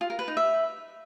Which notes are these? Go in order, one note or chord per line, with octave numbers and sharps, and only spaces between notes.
F4
A#4
B4
D#4
E5